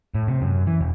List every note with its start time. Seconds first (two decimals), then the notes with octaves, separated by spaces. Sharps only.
0.15 A2
0.28 C3
0.42 F#2
0.67 E3
0.81 E1